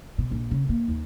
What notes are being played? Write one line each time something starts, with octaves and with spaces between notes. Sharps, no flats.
B2
A#1
C#3
A#3
D#2